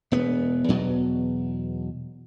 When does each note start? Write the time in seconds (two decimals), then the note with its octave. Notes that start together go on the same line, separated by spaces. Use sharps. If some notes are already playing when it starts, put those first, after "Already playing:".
0.12 E1 B3
0.68 E2 B2 F#3